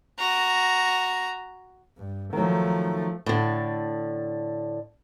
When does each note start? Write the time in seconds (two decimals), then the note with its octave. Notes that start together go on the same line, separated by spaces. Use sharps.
0.19 F#4 A#5
1.97 G2
2.33 D#3 F3 F#3 A3
3.26 A2 D3